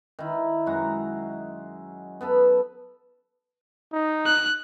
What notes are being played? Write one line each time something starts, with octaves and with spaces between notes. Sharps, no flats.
D#3 E4
F#2 G#3 F#4 A#5
B3 A4 A5 B5
D#4
F#6